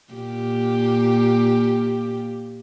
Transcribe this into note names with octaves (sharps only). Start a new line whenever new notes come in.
A#2 G4